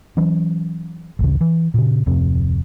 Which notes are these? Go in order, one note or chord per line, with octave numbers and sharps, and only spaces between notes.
E3 F#3 C#4
A1 D2 C#3
E3
A#2 C#3
D1 F2 C3 C4